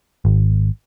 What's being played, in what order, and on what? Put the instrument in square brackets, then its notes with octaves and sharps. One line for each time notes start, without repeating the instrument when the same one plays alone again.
[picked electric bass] G#1